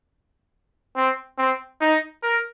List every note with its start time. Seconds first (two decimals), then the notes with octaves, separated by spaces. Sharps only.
0.96 C4
1.38 C4
1.81 D#4
2.23 A#4